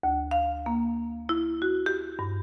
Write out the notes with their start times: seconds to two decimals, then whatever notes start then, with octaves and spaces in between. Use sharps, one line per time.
0.03 D2
0.31 F5
0.66 A#3
1.29 E4
1.62 F#4
1.86 G4
2.19 G2